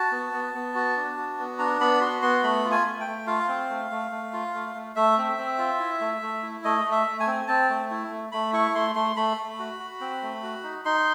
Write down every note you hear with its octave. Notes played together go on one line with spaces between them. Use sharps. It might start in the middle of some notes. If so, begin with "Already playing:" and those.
Already playing: F#4 A5
B3
B3
B3
F#4
D4
F#4
B3
D4 A#5
B3 B5
F#4 C6
B3 C6
A3 B5
F4
G#5
A3
G5
A3
F4 F5
C4
A3
A3
A3
F4
A3
A3
A3 E5
C4
C4
F4
E4
A3
A3
E4
A3 D#5
A3
E5
A3
G#5
C4
C4 A5
A3
E4
A3
A3 B5
E4 C#6
A3 C6
A3 C6
A3 B5
A3
F#4
F#4
C4
A3
F#4
D#4
D#4 C6